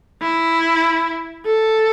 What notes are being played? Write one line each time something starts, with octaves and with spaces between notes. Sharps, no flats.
E4
A4